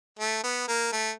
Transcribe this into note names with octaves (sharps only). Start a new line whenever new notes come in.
A3
B3
A#3
A3